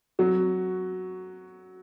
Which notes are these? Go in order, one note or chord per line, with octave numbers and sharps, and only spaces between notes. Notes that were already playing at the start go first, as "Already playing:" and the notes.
F#3 F#4